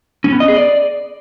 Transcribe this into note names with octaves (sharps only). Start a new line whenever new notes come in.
C#4
B3
D#5
G#4
D5